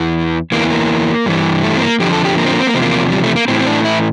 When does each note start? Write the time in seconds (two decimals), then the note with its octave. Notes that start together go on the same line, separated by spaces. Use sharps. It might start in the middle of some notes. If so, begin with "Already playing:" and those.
Already playing: E2 E3
0.52 E2 E3 A#3
0.70 A#3
1.26 G2 E3
1.63 A3
1.77 C4
1.82 A#3
2.00 F2 D3 F3 G4
2.12 A4
2.25 G4
2.37 A#3
2.45 C4
2.52 A#3
2.60 C4
2.67 A#3
2.74 E2 C3 F3 C4
2.82 A#3
3.10 G3
3.23 A3
3.36 A#3
3.48 A2 E3 C4
3.61 C4
3.67 D4
3.85 E4